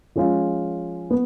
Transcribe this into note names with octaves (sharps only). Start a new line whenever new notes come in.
F3 G#3 C#4 F4
B3